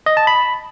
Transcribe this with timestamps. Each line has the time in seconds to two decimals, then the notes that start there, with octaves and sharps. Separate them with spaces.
0.06 D#5
0.17 A5
0.27 B5